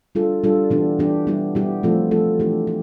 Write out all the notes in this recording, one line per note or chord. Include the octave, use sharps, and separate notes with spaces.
G3 D4 F4 A4
G3 D4 F4 A4
E3 B3 D4 G4
E3 B3 D4 G4
G3 B3 E4 G4
G3 B3 E4 G4
F3 A3 C4 F4 A4
F3 A3 C4 F4 A4
E3 A3 D4 G4
G4